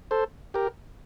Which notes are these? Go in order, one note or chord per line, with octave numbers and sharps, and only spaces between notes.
A4 C5
G4 A#4